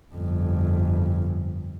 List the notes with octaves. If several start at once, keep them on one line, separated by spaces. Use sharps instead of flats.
G1 F2